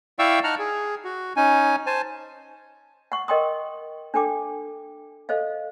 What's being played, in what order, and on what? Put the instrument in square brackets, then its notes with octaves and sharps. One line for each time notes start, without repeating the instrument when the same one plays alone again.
[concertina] E4 D5 F5 G5 C#6 E6
D#4 F#5 A5 A#5 F6
G#4
F#4
C#4 D#4 G#5
C5 G#5 A5
[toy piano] F#5 C#6
A#4 D#5 F#5 G5 C6 D#6
D4 A4 G5 D6
A4 C5 D#5 F5